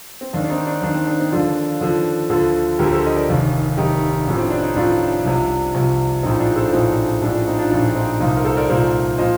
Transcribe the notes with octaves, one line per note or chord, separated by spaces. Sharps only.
C4
D#2 D#3 D4
D4
C4 D#4
D4
D#2 D#3 D4
C4
D4
C4 D#4
D#2 D3 F3 D4 F4
D#2 D3 F3
D2 D3 F3 F4 A4
D2 D3 F3 G4 A#4
A4 C5
D#5
A#4 D5
F1 D#2 D#3
F1 D#2 D#3 D#4 G4
A1 A2 F3
C4
D4
D#4
A1 A2 F3 D4 F4
C2 C3 F3
C2 C3 F3
A#1 A2 F3 C4 D#4
D4 F4
A4 C5
A#1 A2 F3 C4 D#4
A#1 A2 F3 D4
D4
C4 D#4
D4 F4
A#1 A2 F3 D4
C4 D#4
C2 A#2 F3 C4 D#4
A#4
A4 C5
A#4 D5
C2 A#2 F3 A4 C5
A#2 F3 C5 D#5